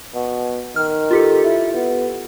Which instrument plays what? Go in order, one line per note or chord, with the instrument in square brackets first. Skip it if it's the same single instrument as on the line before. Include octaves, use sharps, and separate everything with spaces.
[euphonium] B2
[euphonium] D#3 [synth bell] F6
[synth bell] F4 G4 A4
[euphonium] E4
B3